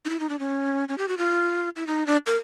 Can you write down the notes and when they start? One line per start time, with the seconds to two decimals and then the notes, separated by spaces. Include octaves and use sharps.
0.05 D#4
0.09 E4
0.20 D#4
0.29 D4
0.39 C#4
0.89 C#4
0.98 G4
1.08 F#4
1.18 F4
1.76 E4
1.87 D#4
2.07 D4
2.26 A#4